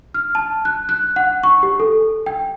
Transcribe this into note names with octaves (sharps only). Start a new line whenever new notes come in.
F6
A5
F#6
F#6
F#5
C#6
G4
A4
G5